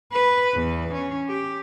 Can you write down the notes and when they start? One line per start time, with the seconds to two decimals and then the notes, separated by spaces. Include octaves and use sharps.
0.13 B4
0.55 E2
0.94 C#4
1.29 G4